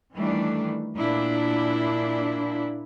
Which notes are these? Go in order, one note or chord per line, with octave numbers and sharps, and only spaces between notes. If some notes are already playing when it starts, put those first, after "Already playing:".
D#3 E3 G3 A3 D4
A#2 D4 E4